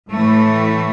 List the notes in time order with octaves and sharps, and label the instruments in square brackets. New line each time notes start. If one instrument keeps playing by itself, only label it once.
[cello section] A2 E3 A3